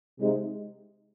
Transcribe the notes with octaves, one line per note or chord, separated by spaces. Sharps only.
C3 G#3 D#4